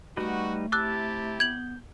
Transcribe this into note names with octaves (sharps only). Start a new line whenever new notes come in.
G3 A3 D#4 F#4 B4
C3 E4 G4 A5 D6 E6 F#6
B3 G6 G#6 F#7